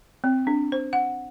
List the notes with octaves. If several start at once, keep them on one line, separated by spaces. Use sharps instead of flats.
C4
D4
C5
F#5